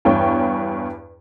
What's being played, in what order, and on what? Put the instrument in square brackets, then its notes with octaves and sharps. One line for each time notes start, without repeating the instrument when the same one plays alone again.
[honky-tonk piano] E2 G2 C#5 G5